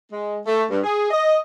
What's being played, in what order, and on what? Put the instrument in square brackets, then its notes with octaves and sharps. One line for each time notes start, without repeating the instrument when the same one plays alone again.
[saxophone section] G#3
A3
G2
G#4
D#5